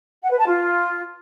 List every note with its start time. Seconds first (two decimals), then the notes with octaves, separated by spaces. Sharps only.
0.22 F#5
0.30 B4
0.38 A5
0.47 F4